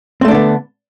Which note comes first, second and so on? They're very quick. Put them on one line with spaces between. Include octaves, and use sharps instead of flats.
C4 A3 D4 D3 B3